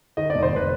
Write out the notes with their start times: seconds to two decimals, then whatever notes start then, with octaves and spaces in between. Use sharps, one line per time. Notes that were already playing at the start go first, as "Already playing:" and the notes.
0.17 D#3 D#5
0.30 D5
0.35 F1
0.43 C5
0.51 F1 B4